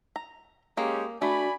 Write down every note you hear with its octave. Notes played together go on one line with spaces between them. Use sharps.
A#5
G#3 A#3 C#4 G4
A3 D4 F#4 D5 G#5 B5